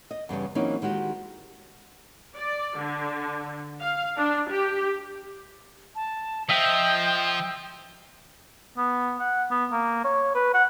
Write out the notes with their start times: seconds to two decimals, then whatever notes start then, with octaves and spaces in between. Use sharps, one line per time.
0.11 D#5
0.29 E2 G2 C#3 G3
0.55 E3 F#3 A#3 C4 C#4 D#4
0.82 D#3 G#3 F#4 G4
2.36 D5
2.79 D3
3.80 F5
4.17 D4
4.50 G4
5.95 A5
6.49 F3 D#5 E5 G5
8.78 B3
9.20 F#5
9.51 B3
9.72 A#3
10.04 C#5
10.35 B4
10.54 F#5